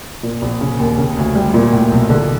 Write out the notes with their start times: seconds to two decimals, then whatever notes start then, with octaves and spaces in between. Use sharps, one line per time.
0.23 A#2
0.42 A#1
0.61 C#3
0.79 D#2
0.98 C#3
1.17 D2
1.35 G3
1.54 A#2
1.73 A2
1.92 B1
2.10 D3